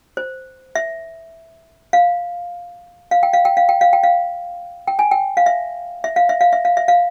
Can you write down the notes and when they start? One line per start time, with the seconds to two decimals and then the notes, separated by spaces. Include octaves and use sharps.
0.17 C5
0.75 E5
1.93 F5
3.11 F5
3.23 G5
3.33 F5
3.45 G5
3.57 F5
3.69 G5
3.81 F5
3.93 G5
4.03 F5
4.87 G5
4.99 G#5
5.11 G5
5.37 F5
5.46 E5
6.04 E5
6.16 F5
6.29 E5
6.41 F5
6.53 E5
6.65 F5
6.77 E5
6.88 F5